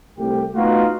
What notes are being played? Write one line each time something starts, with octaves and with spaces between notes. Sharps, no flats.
C2 A3 G4
A3 B3 D#4 F4 F#4